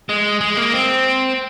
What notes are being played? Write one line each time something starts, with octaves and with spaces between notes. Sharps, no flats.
G#3
G#3
A#3
C4